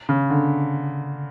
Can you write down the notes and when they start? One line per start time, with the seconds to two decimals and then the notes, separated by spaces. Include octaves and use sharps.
0.09 C#3
0.30 D3